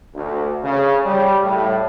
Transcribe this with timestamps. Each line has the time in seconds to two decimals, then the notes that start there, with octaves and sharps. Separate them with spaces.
0.15 D2
0.64 C#3
1.06 G3
1.43 A2